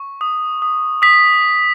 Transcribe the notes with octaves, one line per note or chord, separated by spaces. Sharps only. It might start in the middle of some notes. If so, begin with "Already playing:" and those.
Already playing: C#6
D#6
D#6
D#6 B6